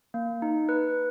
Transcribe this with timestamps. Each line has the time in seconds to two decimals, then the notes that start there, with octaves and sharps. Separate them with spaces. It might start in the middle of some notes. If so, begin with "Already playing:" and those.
0.14 A#3
0.42 D#4
0.69 B4